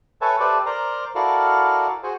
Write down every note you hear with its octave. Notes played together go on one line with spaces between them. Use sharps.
A4 B4 C#5 E5 G#5 A5
G4 A4 B4 C5 D5 E5
A#4 C5 D5 A#5 C6
E4 F#4 A4 A#4 D5 F5
F#4 G#4 C5